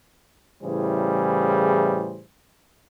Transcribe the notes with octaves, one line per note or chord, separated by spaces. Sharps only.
A2 C#3 E3 G3 G#4 C5